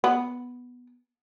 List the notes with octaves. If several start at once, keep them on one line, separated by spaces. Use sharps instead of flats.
B3